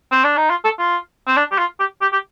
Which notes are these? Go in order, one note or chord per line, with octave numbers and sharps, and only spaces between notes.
C4
D4
D#4
F4
A4
F4
C4
D4
G4
F4
G4
G4
G4